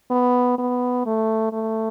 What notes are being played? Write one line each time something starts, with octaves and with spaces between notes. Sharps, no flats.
B3
B3
A3
A3